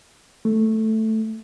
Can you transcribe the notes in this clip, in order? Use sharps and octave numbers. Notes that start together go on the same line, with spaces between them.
A3